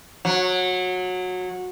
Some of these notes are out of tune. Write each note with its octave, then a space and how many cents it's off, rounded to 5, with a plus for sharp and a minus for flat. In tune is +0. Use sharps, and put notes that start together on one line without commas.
F#3 -20